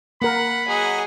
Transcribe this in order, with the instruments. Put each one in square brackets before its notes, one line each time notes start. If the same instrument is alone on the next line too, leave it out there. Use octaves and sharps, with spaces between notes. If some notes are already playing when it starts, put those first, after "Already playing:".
[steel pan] A#3 A#4 [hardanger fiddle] F#5 [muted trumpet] B5
[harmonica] F#3 D#5 [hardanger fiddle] G#4 F#5